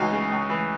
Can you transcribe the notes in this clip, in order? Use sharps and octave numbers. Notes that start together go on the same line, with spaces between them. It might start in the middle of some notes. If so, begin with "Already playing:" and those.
Already playing: C#2 E3 D#4 F#4
C#3
C#2
E3